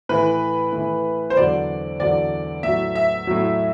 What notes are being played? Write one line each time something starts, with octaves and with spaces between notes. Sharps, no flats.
A2 E3 B4
A2 E3
C5
E2 D3 F#3 D5
E2 D3 F#3 D5
A2 F#3 E5
E5
A2 F#3